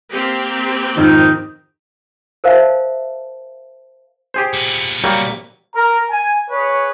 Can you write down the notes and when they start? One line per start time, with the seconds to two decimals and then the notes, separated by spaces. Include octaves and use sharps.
0.10 A#3 C4 G4
0.97 F2 G#2 D#3 D#4 E6
2.44 A#4 C5 E5 F5 A5
4.34 G4 G#4 C5
4.53 A#2 B3
5.04 F#3 G3 A#3
5.75 A#4 A#5
6.10 G#5
6.50 G#4 B4 C#5